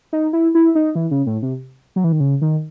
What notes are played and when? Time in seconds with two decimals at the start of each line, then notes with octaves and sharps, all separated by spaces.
0.13 D#4
0.33 E4
0.55 E4
0.75 D#4
0.95 E3
1.11 C#3
1.27 A2
1.42 C3
1.96 F#3
2.04 E3
2.12 D#3
2.20 C#3
2.42 D#3